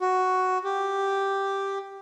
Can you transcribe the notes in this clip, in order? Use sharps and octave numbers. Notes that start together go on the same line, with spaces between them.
F#4
G4